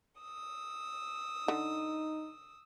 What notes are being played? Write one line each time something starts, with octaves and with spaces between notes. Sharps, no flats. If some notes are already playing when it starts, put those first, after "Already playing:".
D#6 E6
D3 D#4